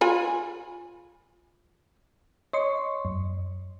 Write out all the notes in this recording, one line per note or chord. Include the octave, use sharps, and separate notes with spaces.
F4 G#5 B5
C#5 D#5 C6 C#6
F#2